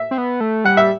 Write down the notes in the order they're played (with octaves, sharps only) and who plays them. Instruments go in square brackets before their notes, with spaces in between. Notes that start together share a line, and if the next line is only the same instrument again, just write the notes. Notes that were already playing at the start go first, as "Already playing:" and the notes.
Already playing: [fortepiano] E5
[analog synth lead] C4
B3
A3
[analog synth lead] G3 [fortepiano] F#5
[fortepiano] E5